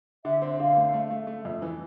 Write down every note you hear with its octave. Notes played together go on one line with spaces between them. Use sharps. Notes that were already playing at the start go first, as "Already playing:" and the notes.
D3 E5
C4
D3 F5
A3
A3
A3
A3
F2
E3